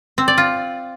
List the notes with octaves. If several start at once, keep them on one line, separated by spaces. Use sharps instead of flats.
C4
D5
F4